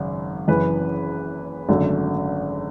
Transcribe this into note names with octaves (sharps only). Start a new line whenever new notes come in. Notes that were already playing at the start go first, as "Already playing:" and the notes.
Already playing: G#1 F#2 C#3
F#1 F#2 E3 B4
G#1 F#2 D3 F#3 A3